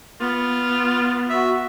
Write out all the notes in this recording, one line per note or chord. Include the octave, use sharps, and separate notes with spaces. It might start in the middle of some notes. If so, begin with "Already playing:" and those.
B3 F4
F#4 E5